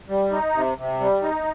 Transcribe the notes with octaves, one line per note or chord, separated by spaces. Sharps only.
G3
D#4
C3
C3
G3
D#4